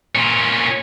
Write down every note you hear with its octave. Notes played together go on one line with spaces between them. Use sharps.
A#2 C#4